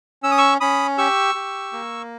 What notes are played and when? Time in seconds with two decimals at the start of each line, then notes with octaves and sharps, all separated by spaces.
0.23 C#4 E6
0.31 D#6
0.38 C#6 E6
0.61 C#4 B5 D#6
0.98 G4 C#6 E6
1.35 G4
1.73 A#3